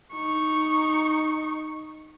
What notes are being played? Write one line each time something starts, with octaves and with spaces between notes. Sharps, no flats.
D#4 C#6